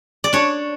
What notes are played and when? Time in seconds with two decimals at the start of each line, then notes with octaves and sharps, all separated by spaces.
0.24 D5
0.33 D4 C#5